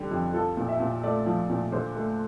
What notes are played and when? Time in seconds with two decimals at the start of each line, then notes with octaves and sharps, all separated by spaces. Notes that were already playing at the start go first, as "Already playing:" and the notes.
Already playing: D3 G3
0.11 F2
0.34 F3 A4
0.57 A#2
0.68 E5
0.80 A#2
1.03 A3 D5
1.26 F3
1.50 A#2
1.72 D3 C5
1.96 A3